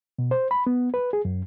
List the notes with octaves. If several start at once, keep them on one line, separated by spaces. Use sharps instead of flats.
B2
C5
B5
B3
B4
G#4
F#2